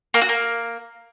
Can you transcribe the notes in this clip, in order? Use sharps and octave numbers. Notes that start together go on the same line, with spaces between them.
A#3
F#4
A#3